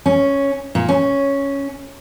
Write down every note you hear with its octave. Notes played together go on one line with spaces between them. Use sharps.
C#4
A#2
C#4